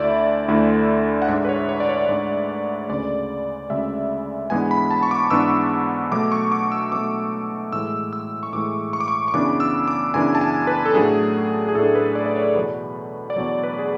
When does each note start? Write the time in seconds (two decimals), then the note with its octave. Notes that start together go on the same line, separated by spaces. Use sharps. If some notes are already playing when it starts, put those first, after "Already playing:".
Already playing: D2 D3 A3 E4 D5 E5
0.48 D2 D3 A3 E4
1.22 F#5
1.28 G#2 G#3 D4 E5
1.45 B4
1.49 C#5
1.69 C#5
1.80 D5
1.89 C#5
2.09 G#2 G#3 D4 C#5
2.89 D2 C#3 G#3 D5
3.70 D2 C#3 G#3 E5
4.50 G#2 E3 G#3 B3 D4 G#5
4.71 B5
4.91 A5
5.03 C#6
5.11 D6
5.31 G#2 E3 G#3 B3 D4 E6
6.12 B2 F#3 A3 D6
6.32 C#6
6.52 D6
6.72 E6
6.92 B2 F#3 A3 D6
7.72 A2 E3 G#3 E6
8.13 E6
8.43 C#6
8.53 A2 E3 G#3 D6
8.93 C#6
9.00 D6
9.08 C#6
9.28 C#6
9.33 F#2 C#3 E3 B3 D4 D6
9.60 E6
9.88 D6
10.14 F#2 C#3 E3 B3 D4 G#5
10.35 A5
10.41 G#5
10.67 B4
10.86 A4
10.94 A2 F#3 A3 D4 G#4
11.69 G#4
11.75 A2 F#3 A3 D4 A4
11.95 B4
12.15 D5
12.26 D5
12.36 C#5
12.56 E2 B2 F#3 B4
13.30 D5
13.36 E2 B2 F#3 C#5
13.63 B4
13.79 G#4